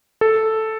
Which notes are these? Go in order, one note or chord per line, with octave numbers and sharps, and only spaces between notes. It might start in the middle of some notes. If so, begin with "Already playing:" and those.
A4